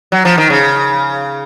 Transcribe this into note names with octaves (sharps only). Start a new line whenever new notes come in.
F#3
F3
D#3
C#3